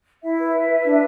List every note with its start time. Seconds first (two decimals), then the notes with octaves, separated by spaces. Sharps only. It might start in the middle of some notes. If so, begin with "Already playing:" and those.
0.23 E4 E5
0.38 B4
0.54 B4
0.69 B4
0.84 D4